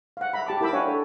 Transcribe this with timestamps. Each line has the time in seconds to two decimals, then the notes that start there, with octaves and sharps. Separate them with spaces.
0.17 F5 F#5
0.33 E5 A#5 B5
0.46 G4 A5 D6
0.61 E4 A#4 G5 B5 D6 E6
0.73 D4 C#5 F5 F#5 G#5
0.88 A4